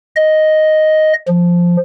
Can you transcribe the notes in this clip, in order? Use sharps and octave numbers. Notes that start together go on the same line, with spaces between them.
D#5
F3